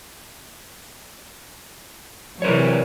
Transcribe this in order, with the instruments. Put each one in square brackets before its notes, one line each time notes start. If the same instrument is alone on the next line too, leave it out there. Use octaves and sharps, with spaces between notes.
[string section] C3 E3 F#3 [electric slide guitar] A#4 B4 C#5